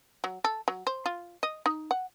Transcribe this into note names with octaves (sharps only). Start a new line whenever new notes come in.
F#3
A4
F#3
C5
F4
D#5
D#4
F#5